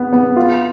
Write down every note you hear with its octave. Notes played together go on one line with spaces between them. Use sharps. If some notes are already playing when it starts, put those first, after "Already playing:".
Already playing: B3
B3
F4